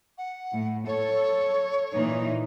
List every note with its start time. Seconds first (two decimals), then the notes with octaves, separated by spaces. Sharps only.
0.18 F#5
0.53 A2
0.87 A4 C#5
1.93 A#2 E3 D#4